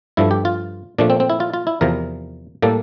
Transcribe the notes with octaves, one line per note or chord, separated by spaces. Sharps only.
G2 F3 A3 E4
G4
F4
A#2 F3 A3 D4
C4
C4
E4
F4
F4
E4
E2 C3 F3 A#4
A2 G3 A#3 A4